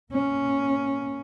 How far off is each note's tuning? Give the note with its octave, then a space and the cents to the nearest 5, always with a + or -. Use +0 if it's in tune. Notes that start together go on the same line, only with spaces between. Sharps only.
A#3 +0 C#4 +0